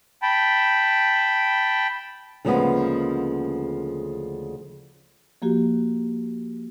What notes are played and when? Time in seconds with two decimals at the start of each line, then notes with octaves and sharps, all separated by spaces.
0.22 G5 A5 B5
2.45 D2 C#3 F3 G#3 A#3 B3
5.42 F3 A#3 F#4 G4